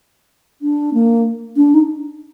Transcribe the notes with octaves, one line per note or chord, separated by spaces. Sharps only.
D4
A#3
D4
D#4